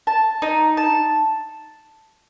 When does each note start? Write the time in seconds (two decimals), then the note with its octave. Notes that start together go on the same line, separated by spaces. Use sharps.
0.07 A5
0.42 D#4
0.77 A5